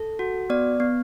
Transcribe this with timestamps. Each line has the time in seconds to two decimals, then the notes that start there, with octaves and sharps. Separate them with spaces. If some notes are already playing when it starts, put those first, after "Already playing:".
Already playing: A4
0.19 F#4
0.50 B3 D5
0.80 B3